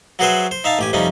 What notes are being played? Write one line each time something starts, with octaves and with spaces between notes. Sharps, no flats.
F#3 F#4 G#4 B4 C5 E5
C5
D#4 E5 F5 A5
A1 G4 G#5
F2 C3 G3 C#4 D#4